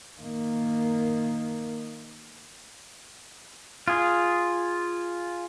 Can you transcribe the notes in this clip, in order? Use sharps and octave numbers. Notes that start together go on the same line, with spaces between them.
D#3 A#3
F4 G#4